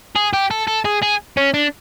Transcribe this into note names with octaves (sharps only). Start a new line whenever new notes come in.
G#4
G4
A4
A4
G#4
G#4
C#4
D4